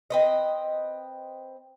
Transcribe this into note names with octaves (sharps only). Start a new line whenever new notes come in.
C4 B4 D#5